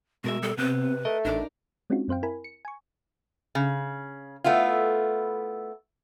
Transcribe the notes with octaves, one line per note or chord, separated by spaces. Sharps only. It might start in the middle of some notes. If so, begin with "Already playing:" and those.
B2 G#3 F#4 A#4 E5
G3 A4
C3 B3 C4 B4
A3 A#4 D#5
A1 D4 D#4 A#4 D5
G#3 C4 C#4 D#4 F4 F#4
F#2 C4 C5 F5 G5
E4 A#4 G#5 B5
C#7
G#5 C#6
C#3
A3 B3 E4 F4